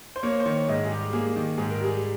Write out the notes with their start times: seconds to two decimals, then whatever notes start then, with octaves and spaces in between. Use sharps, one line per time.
0.16 C5
0.23 A#3 C#5
0.40 C5
0.45 D#3 C#5
0.68 G#2 D#5
0.85 G#4
0.90 G3 G4
1.13 A#3 G#4
1.36 D#3
1.57 G#2 G#4
1.71 A#4
1.81 G3 G#4